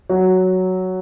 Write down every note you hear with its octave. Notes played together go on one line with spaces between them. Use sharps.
F#3